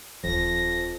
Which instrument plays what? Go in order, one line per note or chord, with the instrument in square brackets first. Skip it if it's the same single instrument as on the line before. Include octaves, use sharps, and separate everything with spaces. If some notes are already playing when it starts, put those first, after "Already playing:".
[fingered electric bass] D#1 F3 [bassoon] F2 [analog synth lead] A#6